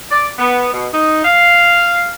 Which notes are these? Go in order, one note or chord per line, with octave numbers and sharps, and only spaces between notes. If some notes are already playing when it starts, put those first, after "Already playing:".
D5
B3
B2
D#4
F5